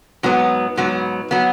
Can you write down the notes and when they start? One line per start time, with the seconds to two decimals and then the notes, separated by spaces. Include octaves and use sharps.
0.23 G#2 F#3 B3
0.77 G#2 F#3 B3
1.31 F#3 B3